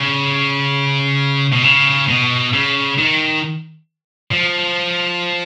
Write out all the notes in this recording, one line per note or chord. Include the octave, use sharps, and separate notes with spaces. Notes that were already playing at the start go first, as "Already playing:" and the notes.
Already playing: C#3
B2
C#3
B2
C#3
D#3
F3